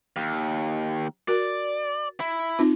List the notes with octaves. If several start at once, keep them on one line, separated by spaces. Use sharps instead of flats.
D#2
F#4 A#4 D5
E4
C4 D#4 F4